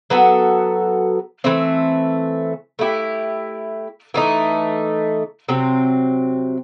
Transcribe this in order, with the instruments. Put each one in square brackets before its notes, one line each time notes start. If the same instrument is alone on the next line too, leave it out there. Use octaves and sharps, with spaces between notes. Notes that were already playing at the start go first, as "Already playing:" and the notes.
[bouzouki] F#3 B3 F#4 A4
E3 A3 C4
A3 E4 G4
E3 A3 D#4
C3 F#3 C4